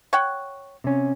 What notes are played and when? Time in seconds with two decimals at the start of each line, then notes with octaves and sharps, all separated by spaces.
0.13 C#5 F#5 G5
0.84 C3 C#4